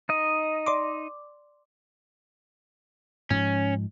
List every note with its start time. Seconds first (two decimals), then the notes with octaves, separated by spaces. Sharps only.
0.09 D#4 D#5
0.66 D5 C6 D6
3.30 G#2 F3 G#3 C#4